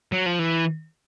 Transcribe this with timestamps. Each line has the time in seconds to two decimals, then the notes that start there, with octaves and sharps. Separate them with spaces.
0.12 F#3
0.26 F3
0.39 E3